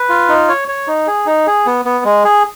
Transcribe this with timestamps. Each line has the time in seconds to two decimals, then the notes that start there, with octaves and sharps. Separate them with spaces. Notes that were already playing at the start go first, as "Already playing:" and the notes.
Already playing: B4
0.09 F4
0.29 D#4
0.49 C#5
0.68 C#5
0.87 D#4
1.07 G#4
1.26 D#4
1.47 G#4
1.66 B3
1.85 B3
2.05 G#3
2.24 G#4